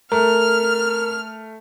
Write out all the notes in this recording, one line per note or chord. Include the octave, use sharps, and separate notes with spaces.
A3 A#4 F6